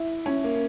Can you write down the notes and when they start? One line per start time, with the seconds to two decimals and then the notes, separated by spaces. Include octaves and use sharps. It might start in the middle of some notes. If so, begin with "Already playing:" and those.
Already playing: E4
0.26 C#4
0.44 A#3